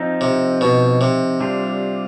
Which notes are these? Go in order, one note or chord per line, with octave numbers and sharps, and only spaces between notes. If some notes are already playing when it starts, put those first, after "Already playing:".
Already playing: F3 C4 D#4
C3
B2
C3
G3 D4 F4